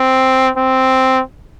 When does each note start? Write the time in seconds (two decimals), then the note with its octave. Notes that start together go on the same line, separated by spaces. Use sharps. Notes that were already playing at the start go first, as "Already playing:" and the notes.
Already playing: C4
0.57 C4